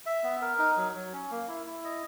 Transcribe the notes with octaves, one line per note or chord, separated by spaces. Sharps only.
E5
B3
A#4
D#4
F#3
F#3
C#4
A#3
E4
E4
D#5